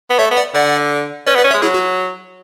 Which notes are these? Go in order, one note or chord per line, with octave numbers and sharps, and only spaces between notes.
B3
A3 C#5 E5
B3
D5 F#5
D3 D5 F#5
C#4 B4 D5
B3
B4 D5
C#4
C#5 E5
G#3
F#3 E4 G#4
F#4